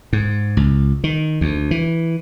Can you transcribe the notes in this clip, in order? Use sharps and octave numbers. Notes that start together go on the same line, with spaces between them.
G#2
C#2
D#3
D2
E3